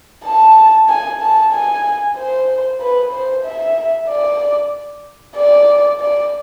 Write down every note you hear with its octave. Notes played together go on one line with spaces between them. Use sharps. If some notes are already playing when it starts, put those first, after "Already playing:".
A5
G#5
A5
G#5
C5
B4
C5
E5
D5
D5
D5